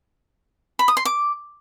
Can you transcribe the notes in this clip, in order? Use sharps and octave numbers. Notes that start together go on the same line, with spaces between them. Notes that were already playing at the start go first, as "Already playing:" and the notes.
B5
D#6
C6
D6